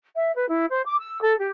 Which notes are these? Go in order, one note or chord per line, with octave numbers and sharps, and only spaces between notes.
E5
B4
E4
C5
D6
E6
A4
G4